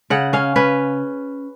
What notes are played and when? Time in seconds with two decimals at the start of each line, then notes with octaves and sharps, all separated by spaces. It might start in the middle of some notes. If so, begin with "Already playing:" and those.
0.10 C#3 F#5
0.33 C#4 F5
0.56 C#4 B4